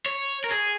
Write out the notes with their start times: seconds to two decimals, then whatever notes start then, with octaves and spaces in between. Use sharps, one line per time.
0.06 C#5
0.44 A#4
0.51 G#4